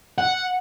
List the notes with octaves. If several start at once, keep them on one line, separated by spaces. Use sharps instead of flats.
F#5